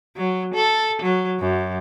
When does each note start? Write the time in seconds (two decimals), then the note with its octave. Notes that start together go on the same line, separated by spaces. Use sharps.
0.16 F#3
0.54 A4
1.02 F#3
1.39 F#2